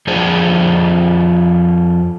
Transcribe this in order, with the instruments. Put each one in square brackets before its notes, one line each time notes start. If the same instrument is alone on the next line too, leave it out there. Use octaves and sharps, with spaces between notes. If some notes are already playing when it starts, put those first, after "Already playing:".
[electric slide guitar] F2 D4 G#4 C5